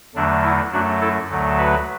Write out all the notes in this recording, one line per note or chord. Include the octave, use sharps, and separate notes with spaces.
E2 D3 F#3 A3 D4
E4
F#2 F#3 A3 D4 F#4
E4 A4
D2 D3 F#3 A3
F#4 B4